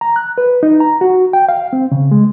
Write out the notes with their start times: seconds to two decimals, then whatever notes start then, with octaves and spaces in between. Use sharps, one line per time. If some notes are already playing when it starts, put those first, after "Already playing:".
0.01 A#5
0.16 F#6
0.38 B4
0.63 D#4
0.80 A#5
1.01 F#4
1.33 G5
1.49 F5
1.73 C4
1.92 C#3
2.11 G#3